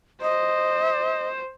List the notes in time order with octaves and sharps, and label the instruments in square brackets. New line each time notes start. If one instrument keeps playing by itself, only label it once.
[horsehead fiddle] C5 [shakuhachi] D#5